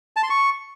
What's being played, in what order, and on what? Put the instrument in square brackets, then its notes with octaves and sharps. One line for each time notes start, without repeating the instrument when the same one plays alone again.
[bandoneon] A5
C6
C#6